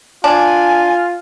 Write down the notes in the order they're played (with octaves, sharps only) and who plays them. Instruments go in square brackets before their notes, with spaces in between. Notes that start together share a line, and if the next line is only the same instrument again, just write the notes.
[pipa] D4 [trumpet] F4 [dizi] G#5